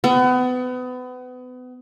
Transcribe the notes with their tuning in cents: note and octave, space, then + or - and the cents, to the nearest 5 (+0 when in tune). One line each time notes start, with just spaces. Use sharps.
B3 +30